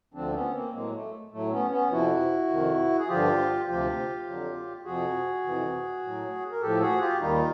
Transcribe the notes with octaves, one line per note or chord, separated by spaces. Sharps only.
D2 D3 F3 C4 D4
B3 C#4
A#3 C4
A2 F#3 G#3 A#3
A3
A2 F#3 A3
B3 C#4
B3 C#4
F2 C3 F3 E4 F#4
F2 C3 D#3
G#4
G2 D3 F3 F4 G4
D2 C3 F3 F4 G4
F2 D3 F#3
F2 C3 F3 F#4 G#4
F2 C3 E3
A2 F#3
A#4
A2 F3 G4 A4
F#4 G#4
F4 G4
D#2 D#3 G3 D#4 F4